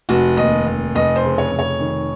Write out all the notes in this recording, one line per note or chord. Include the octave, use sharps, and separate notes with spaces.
F1 F#4
D#2 D#5
F1
F1 D#5
C5
C#3
C#5
F1
C#5
D#3